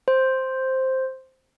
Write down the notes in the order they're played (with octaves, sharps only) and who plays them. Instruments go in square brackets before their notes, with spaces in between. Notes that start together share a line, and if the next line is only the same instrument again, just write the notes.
[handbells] C5